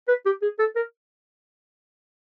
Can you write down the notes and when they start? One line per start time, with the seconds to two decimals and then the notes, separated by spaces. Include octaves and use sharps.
0.08 B4
0.25 G4
0.42 G#4
0.59 A4
0.76 A#4